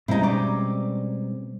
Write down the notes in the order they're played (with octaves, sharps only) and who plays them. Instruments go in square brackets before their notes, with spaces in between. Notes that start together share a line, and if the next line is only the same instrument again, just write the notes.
[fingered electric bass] B2 G3 G#3 [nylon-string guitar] C4 C#4 [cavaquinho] D#4 E4
[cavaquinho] D5 C#6 D6